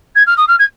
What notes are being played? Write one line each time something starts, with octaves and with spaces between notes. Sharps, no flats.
G#6
F6
D#6
F6
G#6